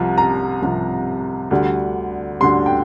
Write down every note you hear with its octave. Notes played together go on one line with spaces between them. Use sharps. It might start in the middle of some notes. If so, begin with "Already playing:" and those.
Already playing: C2 C3 F3
A#5
C2 C3 F3
D2 D3 G3
D2 D3 G3 C6
G5